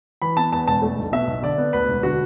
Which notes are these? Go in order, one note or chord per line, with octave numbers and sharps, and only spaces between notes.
E3 B5
B3 A5
E2 A5
E1 A5
A3
B1
B2 E5
B1
D3 D5
B3
D2 B4
E1
D3 F#4